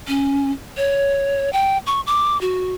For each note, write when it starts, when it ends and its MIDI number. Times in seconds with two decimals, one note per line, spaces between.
0.08 0.51 61
0.77 1.52 73
1.53 1.78 79
1.86 2.01 85
2.07 2.40 86
2.41 2.74 66